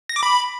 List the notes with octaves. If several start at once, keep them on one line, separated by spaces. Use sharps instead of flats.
A#6
D6
B5